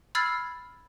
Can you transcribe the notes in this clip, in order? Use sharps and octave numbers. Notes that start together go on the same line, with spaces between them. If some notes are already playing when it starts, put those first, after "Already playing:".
B5 E6 F6 G#6 A6 C7